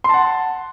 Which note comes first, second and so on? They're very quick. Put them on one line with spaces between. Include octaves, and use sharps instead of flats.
C6 A5 F#5